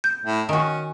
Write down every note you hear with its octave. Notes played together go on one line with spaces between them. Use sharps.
G6
A2
D#3 C#4 F#4